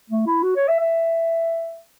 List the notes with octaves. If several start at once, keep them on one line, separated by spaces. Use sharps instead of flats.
A3
E4
F#4
C#5
E5
E5